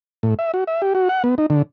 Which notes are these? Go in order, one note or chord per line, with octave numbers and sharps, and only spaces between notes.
A2
E5
F#4
E5
G4
F#4
F#5
B3
D#4
D3